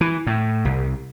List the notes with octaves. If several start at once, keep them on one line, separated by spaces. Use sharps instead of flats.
E3
A2
C2